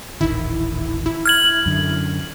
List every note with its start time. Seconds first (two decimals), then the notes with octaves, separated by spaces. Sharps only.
0.21 D#1 A1 D#3 E4
1.06 E4
1.26 F6 G#6 F#7
1.66 F#2 D3